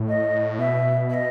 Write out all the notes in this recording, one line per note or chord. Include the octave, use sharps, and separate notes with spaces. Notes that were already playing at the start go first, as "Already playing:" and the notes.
Already playing: A2
D#5
B2 E5
E5
D#5